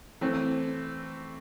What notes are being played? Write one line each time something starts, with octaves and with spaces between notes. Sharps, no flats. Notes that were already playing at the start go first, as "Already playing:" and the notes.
E3 A3 C4